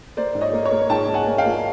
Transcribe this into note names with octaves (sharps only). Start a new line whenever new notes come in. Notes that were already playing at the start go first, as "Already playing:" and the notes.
A#3 C5 D5
G#2
C#5 D#5
A#3
C#5 D#5
A#3
G#2 G5 A5
G#2
F#5 G#5
A#3
F5 G5
A#3